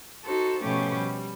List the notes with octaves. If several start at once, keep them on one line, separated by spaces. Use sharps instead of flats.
D#4 F#4 A4 C5
B2 F3 A3 C#4 G4
G3